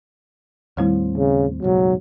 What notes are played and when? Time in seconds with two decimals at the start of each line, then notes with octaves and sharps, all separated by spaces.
0.77 D#2 A2 D#3 G3 C4 E4
1.18 C#3
1.62 F#1 B1 G#2 F#3